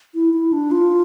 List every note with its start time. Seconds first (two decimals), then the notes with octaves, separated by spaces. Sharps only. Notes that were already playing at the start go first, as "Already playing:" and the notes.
0.15 E4
0.34 E4
0.53 D4
0.71 F4